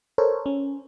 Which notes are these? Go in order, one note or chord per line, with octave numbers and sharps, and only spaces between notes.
A4 A#4 C5 C#5
C#4